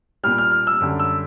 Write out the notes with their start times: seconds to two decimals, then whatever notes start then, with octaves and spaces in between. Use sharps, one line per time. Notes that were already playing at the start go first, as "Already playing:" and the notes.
0.23 A#2 G3 F6
0.38 F6
0.52 F6
0.67 E6
0.80 F#2 D3 G3
0.99 E6